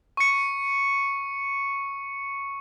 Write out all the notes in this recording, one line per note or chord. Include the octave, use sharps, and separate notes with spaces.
C#6 C#7